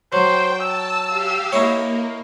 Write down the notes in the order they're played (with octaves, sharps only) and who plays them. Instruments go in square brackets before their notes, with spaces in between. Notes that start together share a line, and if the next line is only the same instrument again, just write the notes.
[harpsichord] F#3 [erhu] C5 [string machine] G5
[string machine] A5 [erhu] E6
[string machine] G4 F5
[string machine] A#3 [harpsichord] D#4 E4 C#5